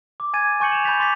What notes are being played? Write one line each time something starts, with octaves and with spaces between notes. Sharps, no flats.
D6
G#5 G#6 A6 D#7
G#5 C#6 G6 C#7 F#7
E7 F7
B5 G6 A6 B6 F7
C6 D6 A6 B6